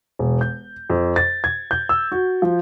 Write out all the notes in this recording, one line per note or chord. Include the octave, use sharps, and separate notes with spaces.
E1
G6
F2
A6
G#6
G6
E6
F#4
F3